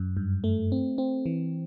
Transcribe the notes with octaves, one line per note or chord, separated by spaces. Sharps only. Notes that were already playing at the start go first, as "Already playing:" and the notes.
Already playing: F#2
G2
A3
C4
C4
E3